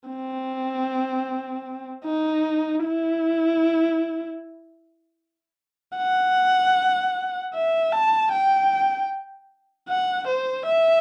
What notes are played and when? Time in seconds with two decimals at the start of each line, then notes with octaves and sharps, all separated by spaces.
0.09 C4
2.05 D#4
2.84 E4
5.97 F#5
7.54 E5
7.93 A5
8.32 G5
9.89 F#5
10.28 C5
10.67 E5